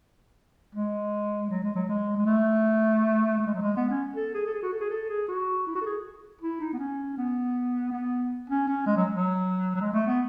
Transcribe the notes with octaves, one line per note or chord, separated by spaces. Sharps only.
G#3
F#3
G#3
F#3
G#3
G#3
A3
A3
G#3
F#3
G#3
B3
C#4
A4
G#4
A4
G#4
F#4
A4
G#4
A4
G#4
F#4
E4
F#4
A4
G#4
E4
D#4
B3
C#4
B3
B3
C#4
C#4
G#3
F#3
F#3
F#3
G#3
A3
B3